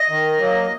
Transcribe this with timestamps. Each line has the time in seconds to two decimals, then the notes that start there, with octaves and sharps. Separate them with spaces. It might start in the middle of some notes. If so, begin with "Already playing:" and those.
Already playing: D#5
0.10 D#3
0.38 F#3 A#3